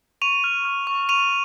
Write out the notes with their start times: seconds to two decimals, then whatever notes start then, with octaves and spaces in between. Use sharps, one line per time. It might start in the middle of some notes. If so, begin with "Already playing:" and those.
0.22 C#6 D#7 F7
0.44 F6
0.65 F6
0.87 C#6
1.09 C#6 D#7 F7